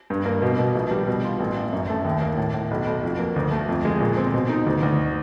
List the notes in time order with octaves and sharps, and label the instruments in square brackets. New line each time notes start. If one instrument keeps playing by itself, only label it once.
[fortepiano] G2
A#3
B2
B2
A#1
G3
B2
F4
A1
A1
F#2
A3
D#2
A#3
A2
A2
B1
B1
F2
A#3
D2
A3
F2
G#3
A#2
C4
B2
D#4
D2
D2